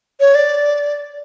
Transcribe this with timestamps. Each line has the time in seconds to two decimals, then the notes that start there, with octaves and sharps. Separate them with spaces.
0.20 C#5
0.35 D5